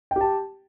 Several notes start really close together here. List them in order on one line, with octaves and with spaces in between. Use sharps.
G5 G4 A5